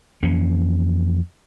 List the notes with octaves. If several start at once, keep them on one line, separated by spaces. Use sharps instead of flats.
F2 E3 A#3 C#4